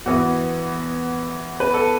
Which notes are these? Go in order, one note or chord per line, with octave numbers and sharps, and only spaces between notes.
E2 E3 B3 F#4
B4
A4